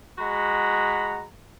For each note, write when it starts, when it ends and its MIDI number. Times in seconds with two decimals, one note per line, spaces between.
0.18 1.24 56
0.18 1.24 66
0.18 1.24 78
0.18 1.24 82
0.18 1.24 83